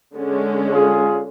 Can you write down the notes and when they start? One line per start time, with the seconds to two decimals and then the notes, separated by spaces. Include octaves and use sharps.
0.15 D3 G#3 C#4
0.73 F4 G#4